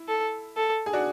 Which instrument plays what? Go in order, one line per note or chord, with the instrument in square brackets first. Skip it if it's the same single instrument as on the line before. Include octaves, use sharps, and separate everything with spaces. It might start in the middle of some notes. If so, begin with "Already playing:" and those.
Already playing: [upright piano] E4
[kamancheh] A4
A4
[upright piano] G#4
D4 F#4